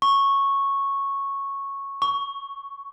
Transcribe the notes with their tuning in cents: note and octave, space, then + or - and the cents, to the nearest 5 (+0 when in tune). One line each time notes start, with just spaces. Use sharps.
C#6 -10
C#6 +15